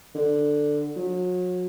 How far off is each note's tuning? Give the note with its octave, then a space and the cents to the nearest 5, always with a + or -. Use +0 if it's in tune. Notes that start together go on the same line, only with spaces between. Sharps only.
D3 +10
F#3 -35